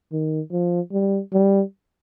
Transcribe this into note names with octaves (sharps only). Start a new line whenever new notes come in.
D#3
F3
G3
G3